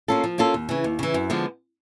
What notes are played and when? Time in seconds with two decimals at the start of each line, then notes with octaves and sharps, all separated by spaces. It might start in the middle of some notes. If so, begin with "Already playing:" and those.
0.08 A#3 C#4 F4 A4
0.24 F3
0.38 A#3 C#4 F4 A4
0.54 D#2
0.69 C#3 E3
0.84 D#2
0.99 C#3 E3
1.14 F#2
1.30 D3 F3 G#3 B3